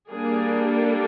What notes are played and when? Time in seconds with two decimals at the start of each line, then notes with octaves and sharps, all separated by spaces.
0.10 G3 A#3 D4 G#4
0.71 A4